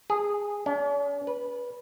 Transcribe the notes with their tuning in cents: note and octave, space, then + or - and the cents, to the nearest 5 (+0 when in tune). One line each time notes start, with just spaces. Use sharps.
G#4 -15
C#4 +45
B4 -15